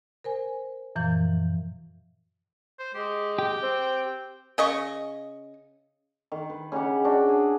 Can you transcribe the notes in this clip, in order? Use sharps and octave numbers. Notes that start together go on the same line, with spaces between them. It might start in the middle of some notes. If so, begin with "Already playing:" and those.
A#4 C5 G#5
F#2 A#2 E3 F3 G6
C5
G#3 G4
G4 G5
C4
C#3 D#5 C#6
D#3
B4
C#3 D#4 G4 F#5
D4 F#4 G5
G#4